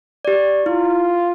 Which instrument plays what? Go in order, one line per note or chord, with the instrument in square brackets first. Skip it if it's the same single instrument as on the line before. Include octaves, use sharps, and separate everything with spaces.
[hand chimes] G4 D5
[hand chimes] E4 [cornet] F4